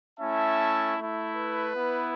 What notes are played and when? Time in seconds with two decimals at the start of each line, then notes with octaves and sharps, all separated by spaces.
0.20 A3 C#4 E4 E5 A5
0.97 A3 E4
1.36 B4
1.74 B3 E4